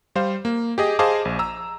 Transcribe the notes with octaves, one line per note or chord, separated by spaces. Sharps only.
G3 C5 F5
A#3
G4 G#4 D#5
G#4 C5 D#5 F5 A5 D6
A#1
A#5 E6